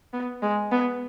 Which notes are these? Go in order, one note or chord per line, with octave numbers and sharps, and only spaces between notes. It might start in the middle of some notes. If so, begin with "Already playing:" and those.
B3
G#3
B3